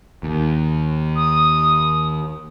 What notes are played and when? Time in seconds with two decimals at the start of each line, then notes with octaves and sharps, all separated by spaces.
0.23 D#2
1.16 D#6